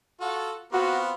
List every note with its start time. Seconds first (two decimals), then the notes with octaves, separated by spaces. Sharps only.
0.21 F4 F#4 A4
0.73 B3 C4 F4 F#4